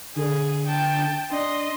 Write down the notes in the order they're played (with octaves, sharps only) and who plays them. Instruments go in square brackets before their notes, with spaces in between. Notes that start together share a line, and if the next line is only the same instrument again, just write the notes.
[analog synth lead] D3 [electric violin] G#4
[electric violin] G5 A5
[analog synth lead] D4 [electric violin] D#5 C6